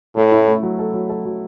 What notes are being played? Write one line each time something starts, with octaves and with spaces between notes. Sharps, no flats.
A2 A3
E4
A3
F#3
A4
F#3
A4
F#3